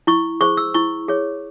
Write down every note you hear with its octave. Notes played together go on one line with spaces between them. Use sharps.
E4 C#6
G#4 C5 C#6
E6
E4 C#6
G#4 C#5